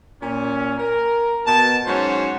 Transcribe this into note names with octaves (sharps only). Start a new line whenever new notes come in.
A#2 C#4
A#4
B2 A5
G#2 F#3 C#4 F#4 C5